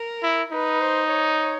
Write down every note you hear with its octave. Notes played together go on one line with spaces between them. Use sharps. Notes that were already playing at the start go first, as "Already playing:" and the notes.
Already playing: A#4
E4
D#4 B4
C5
C#5